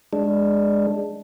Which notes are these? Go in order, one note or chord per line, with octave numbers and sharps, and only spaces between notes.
G#3 D4